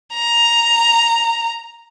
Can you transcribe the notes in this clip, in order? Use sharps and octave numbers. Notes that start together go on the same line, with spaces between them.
A#5